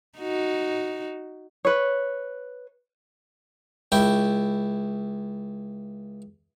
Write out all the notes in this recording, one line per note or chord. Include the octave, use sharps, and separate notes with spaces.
D#4 F#4
B4 C#5
C#2 E4 G5